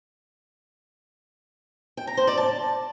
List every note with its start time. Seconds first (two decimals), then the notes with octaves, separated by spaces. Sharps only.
1.97 G5
2.07 A#5
2.17 C5
2.27 D5
2.37 A5